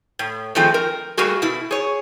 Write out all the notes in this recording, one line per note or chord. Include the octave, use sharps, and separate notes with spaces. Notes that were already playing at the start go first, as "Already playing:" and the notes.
A2
D#3 F3 G#3 A3 C4
A#4
G3 A3 A#3 F#4 G#4
B2 E4
G#4 C#5